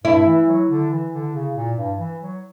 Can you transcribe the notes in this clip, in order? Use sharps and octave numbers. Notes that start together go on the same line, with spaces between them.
G2 E4
E3
F#3
D3
E3
D3
C#3
A#2
G2
E3
F#3